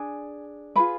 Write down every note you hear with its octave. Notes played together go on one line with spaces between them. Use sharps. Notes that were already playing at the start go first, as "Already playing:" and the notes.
Already playing: D4 G#4 G#5
F4 G#4 B4 B5